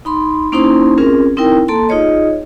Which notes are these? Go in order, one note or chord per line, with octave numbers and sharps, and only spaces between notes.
D#4 B5 C6
A#3 C#4 D#4 E4 C5 C6
C4 C#4 F4 G#4 A#4
C4 D#4 E4 A#4 G5
A#3 A4 A5 C6
D#4 F4 G#4 C#5 D#5